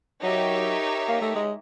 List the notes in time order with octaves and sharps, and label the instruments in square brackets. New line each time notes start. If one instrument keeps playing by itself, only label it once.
[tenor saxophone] F#3 [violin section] D#4 G4 A#4 C#5 E5
[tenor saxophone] A#3
A3
G#3